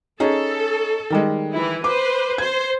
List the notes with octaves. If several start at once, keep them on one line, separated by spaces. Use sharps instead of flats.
C#4 D#4 G#4 A4
D#3 G3 G#3
E3 E4
B4 C5 D6
C5 G#6